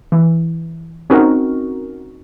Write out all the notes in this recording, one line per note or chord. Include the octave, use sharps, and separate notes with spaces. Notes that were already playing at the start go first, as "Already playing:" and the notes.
E3
C4 C#4 D#4 F#4 A#4